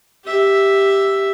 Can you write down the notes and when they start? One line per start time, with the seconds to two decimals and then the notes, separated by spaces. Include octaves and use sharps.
0.25 G4 E5